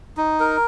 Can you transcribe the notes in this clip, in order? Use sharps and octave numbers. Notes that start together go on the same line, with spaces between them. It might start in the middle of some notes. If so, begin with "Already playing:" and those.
D#4
A#4